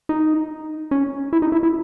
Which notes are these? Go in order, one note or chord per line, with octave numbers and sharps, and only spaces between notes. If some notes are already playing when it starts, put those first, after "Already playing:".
D#4
C#4
E4
D#4
E4
E4